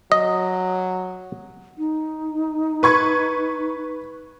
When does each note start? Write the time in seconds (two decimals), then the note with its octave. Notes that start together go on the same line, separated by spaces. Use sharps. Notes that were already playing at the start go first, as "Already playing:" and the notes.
0.12 F#3 D#5
1.78 D#4
2.83 B4 C#6 G#6